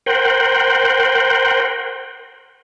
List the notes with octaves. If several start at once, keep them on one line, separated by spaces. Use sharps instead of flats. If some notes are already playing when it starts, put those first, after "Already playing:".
A#4 C5 F#5 G5